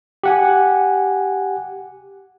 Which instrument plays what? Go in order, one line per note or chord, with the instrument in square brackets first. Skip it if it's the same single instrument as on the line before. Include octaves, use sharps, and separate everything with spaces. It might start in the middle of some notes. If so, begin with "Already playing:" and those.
[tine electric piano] G4 F#5 G#5